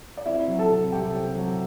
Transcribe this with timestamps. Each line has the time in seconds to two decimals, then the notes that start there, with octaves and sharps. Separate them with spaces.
0.17 D5
0.26 C4 E4 E5
0.48 F#3
0.59 A4 A5
0.71 C3
0.92 C2 G4 G5
1.16 C4
1.37 F#3